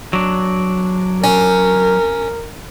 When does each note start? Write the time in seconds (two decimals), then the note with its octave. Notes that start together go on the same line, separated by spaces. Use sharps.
0.13 F#3 D4
1.24 C#4 A#4